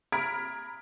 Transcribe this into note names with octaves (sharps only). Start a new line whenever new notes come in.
A#5 B5 F6 G#6 B6 D7